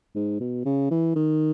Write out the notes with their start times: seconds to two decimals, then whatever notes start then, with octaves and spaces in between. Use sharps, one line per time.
0.15 G#2
0.40 B2
0.65 C#3
0.91 E3
1.16 D#3